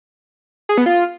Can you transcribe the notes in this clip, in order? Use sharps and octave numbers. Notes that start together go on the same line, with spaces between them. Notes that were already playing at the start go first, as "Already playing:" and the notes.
G#4
B3
F4